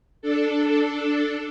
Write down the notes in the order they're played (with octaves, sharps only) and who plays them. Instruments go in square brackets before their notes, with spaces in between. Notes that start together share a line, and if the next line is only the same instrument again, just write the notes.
[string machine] D4 A4